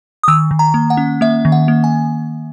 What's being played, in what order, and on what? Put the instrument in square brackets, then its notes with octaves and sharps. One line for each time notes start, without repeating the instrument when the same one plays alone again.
[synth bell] D#6
D#3 E6
D#3
A#5
A#3
F#5
C#4
A#3 E5
D#3
F#5
A#3
G#5